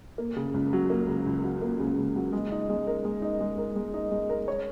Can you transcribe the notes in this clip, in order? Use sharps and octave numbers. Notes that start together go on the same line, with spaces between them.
A#3
C#3
C#2
F#3
A#3
C#3
C#2
F#3
A#3
C#3
C#2
F#3
G#3
D#4
G#3
A#4
G#3
D#4
G#3
A#4
G#3
D#4
G#3
A#4
C#5